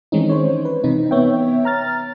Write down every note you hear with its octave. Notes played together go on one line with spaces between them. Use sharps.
D#3 E3 G#3 C4 C#4 D#4
C5 C#5
B4
C3 E3 C4 D#4
B3 C#5 E5 G5
A#5 F6 A6